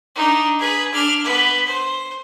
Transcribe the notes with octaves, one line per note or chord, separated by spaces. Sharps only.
D4 D#4
G#4 B4
D4 F6
B3 B4
C5